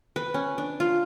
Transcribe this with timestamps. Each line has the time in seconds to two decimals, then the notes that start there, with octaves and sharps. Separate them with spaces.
0.16 B4
0.34 C#4
0.58 D4
0.80 F4